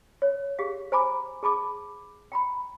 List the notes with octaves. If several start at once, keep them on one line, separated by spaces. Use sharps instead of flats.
C#5
G4 G#4 F5
C5 G#5 A#5 B5 D6
G#4 A5 B5 D6
G5 A#5 B5